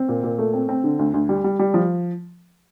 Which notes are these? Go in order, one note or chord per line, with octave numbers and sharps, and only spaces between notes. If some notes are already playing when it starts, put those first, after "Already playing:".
Already playing: C4
A#2
A#2
A3
C4
C4
D3
D2
D2
G3
G3
G3
F3